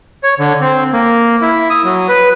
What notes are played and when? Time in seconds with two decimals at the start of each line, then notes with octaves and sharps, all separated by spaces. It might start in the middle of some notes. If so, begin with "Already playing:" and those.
0.24 C#5
0.39 D3
0.61 C4
0.93 A#3
1.42 E4
1.70 D#6
1.84 F#3
2.08 B4